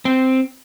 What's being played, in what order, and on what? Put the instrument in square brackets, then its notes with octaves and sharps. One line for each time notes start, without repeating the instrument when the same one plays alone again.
[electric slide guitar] C4